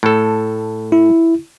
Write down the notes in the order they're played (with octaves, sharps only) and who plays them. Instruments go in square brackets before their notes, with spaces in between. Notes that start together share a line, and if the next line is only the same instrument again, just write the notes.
[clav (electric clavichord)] A2 A4
[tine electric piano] E4